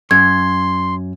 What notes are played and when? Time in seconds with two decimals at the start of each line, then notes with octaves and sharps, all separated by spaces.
0.11 F#2 C6 G#6